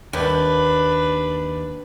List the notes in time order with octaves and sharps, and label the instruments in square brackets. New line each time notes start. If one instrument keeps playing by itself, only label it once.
[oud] D#2 [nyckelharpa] D4 B4